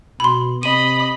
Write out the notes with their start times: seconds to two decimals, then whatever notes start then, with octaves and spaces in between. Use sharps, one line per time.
0.20 B2 B5 C6
0.63 C3 D#5 B5 D#7